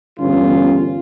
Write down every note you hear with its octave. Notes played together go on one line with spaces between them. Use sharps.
G1 E2 C#4 F4